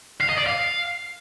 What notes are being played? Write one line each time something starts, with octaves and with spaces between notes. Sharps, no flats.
F5
D#5
D5
F5